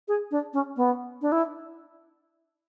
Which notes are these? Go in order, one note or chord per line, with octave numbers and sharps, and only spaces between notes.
G#4
D4
C#4
B3
D4
E4